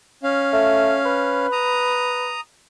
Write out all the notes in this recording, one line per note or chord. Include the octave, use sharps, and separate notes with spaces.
C#4 F5
A3
B4
A#5 D#6